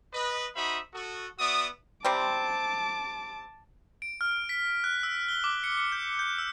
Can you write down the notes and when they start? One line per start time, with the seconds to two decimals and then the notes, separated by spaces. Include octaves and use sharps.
0.13 B4 D#5
0.55 D#4 F#4 C5 E5 B5 D#6
0.93 F#4 A4 D#6
1.39 B3 F#4 D5 E5 D#6
2.05 C3 G3 C4 A5 D6
4.02 D7
4.21 F6
4.49 B6
4.84 F#6
5.03 E6
5.29 G7
5.44 D6
5.64 C#7
5.77 C#7
5.92 G6
6.19 G6
6.38 E6